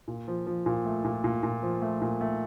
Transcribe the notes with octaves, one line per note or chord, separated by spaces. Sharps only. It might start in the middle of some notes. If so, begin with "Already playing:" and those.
A#2
F3
F3
A#2
A3
A#2
A#2
A#2
F3
A3
A#2
A3